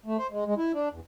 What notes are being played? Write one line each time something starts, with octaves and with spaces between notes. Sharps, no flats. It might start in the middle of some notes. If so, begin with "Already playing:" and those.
A3
C5
G#3
G#3
E4
D4
E2